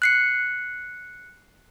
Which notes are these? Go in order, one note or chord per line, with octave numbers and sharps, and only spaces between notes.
F#6 C7 C#7